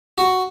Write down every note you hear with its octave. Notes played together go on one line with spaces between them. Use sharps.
F#4